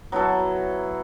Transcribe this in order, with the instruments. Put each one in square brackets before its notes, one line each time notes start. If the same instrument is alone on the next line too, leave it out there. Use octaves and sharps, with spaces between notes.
[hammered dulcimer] F#3 B3 E4 A4